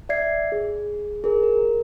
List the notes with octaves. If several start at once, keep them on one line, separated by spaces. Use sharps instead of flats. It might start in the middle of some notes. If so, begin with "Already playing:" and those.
D5 E5 G#6 C7
G#4
G#4 A#4
A#4